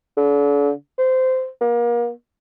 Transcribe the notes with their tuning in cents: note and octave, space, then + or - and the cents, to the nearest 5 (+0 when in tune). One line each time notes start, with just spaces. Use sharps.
D3 -40
C5 -15
A#3 +35